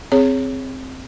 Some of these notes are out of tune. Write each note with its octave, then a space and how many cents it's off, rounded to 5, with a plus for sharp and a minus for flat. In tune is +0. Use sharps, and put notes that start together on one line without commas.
C4 +0 G#4 +0 C#5 +0